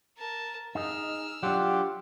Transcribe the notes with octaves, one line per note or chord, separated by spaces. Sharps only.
A#4 A5
D#4 G#4 D#5 E6 F6
F#3 D4 F4 G4 F#5